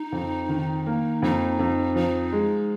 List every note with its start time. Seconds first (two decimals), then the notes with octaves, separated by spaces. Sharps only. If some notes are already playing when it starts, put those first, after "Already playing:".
Already playing: D#4
0.12 F2
0.49 D#3
0.87 A#3
1.22 F2 D#4
1.59 F2
1.96 F3 D#4
2.32 G#3